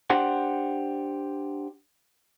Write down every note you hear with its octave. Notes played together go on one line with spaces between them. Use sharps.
D4 G4 C5 F#5